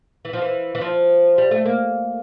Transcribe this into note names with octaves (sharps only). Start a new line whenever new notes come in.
E3
F3
E3
E3
F3
G3
A3
A#3